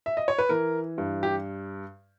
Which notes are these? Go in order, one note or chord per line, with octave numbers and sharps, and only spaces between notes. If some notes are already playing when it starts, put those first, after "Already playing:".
E5
D#5
C#5
B4
E3 A#4
G2
G4